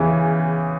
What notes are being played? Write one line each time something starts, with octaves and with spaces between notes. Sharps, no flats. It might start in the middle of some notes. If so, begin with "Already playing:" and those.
Already playing: E2 C#3 E3